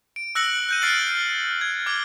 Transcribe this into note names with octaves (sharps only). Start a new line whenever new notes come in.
D7
E6 F#6 A#6 C#7 F#7
F#6 G6 D#7
F6 A6 C7 D7 D#7 F#7
G#6
D6 F6 G#6 G7